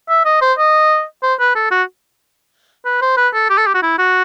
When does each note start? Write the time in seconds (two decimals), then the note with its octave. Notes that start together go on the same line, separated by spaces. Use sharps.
0.09 E5
0.25 D#5
0.42 C5
0.58 D#5
1.23 C5
1.40 B4
1.55 A4
1.71 F#4
2.85 B4
3.02 C5
3.17 B4
3.34 A4
3.50 G4
3.58 A4
3.67 G4
3.74 F#4
3.82 E4
3.98 F#4